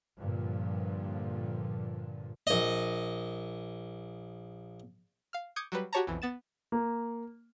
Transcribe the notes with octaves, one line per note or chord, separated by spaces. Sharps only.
G2 A#2 D3 F3
A#1 D#5
F5 F6
D6 D#6 G6 G#6 C#7
F#3 G3 B4
F#4 G4 C#5 A5 A#5
B1 F2 E3
B3 A6 E7
A#3